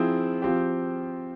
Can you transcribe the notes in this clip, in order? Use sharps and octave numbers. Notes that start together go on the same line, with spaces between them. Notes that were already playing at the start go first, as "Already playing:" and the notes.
Already playing: F3 C4 E4 G#4
F3 C4 G4